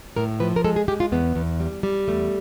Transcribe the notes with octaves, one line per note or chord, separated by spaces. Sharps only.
A2 A#4
F3 B4
A#4
G#3 A4
G#4
G#3 G4
F4
E2 B3
E2
G3
G3
E2 A3